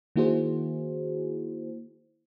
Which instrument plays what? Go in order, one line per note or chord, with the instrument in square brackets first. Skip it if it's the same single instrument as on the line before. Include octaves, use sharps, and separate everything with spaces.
[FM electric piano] D#3 A#3 E4 F#4 G#4 C5